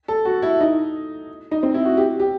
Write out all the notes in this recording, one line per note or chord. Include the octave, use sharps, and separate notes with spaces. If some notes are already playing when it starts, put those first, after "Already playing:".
A4
F#4
E4
D#4
D#4
C4
E4
F#4
G4
G4